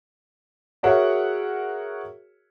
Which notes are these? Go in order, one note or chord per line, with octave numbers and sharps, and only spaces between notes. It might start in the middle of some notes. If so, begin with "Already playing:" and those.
F#4 G#4 A#4 C#5 E5 F#5